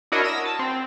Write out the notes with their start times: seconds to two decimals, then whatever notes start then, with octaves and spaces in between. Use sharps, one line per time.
0.12 D4 E4 F#4 A#4 C#5 D#5
0.24 D#6 E6 A#6 D#7
0.45 A5
0.59 C4